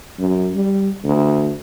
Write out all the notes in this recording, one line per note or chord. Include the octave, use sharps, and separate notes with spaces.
F#2
G3
D2